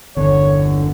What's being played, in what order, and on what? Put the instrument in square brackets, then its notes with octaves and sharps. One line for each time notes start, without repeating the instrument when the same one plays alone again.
[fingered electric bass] G1 E2 [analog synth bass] D3 [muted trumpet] C#5